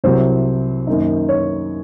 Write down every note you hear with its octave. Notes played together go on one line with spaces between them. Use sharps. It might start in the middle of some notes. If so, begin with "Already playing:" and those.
C2 C3 F#3 C5
F#2 D#3 A#3 D#4
C#5